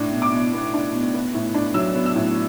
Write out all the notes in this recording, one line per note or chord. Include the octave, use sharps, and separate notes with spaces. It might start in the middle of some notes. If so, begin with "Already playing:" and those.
Already playing: A2 D4
B2
D6
B2
B3
D4
B2
B3
A2
D4
F#3 E6
B3
E6
A2